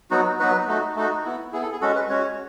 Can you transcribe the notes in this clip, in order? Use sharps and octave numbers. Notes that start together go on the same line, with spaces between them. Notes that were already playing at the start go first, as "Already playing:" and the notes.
F#3 B3 D#4 F#4
F#3 B3 D#4 F#4 B4
A3 D#4 F#4
A3 D#4 F#4
B3 E4
B3 E4 G#4
A4
G#4
G#3 C#4 F#4 A4
B4
G#3 C#4 F#4 C#5